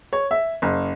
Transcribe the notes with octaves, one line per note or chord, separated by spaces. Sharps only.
C#5
E5
F#1